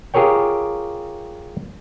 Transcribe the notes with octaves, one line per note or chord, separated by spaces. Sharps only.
F4 G4 G#4 A#4 C#5 G5